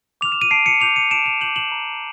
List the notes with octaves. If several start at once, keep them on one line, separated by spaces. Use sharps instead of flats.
D6 F6 F7
E7
D#7
A5 C7 D7
C#7 D#7
D6 G6 D#7 F7
C#7 D#7
A5 D7 E7
D#7 F7
D6 G6 E7 F#7
E7 F#7
A#5